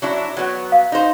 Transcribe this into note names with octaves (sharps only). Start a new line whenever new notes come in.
F#3 D4 E4
F#3 B3
F5
D#4 C5